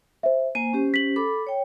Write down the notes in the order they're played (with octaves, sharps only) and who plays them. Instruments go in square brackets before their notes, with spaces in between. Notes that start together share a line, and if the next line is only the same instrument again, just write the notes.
[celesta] C5 E5
[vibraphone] A#3 C5 G#5 [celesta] D#7
[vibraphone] C#4 G4 C5
[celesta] B6 F#7
[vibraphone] A4 B5 D6
C#5 G5